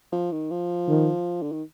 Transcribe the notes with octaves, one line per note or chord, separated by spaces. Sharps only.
F3
D#3
F3
D#3
D3
D#3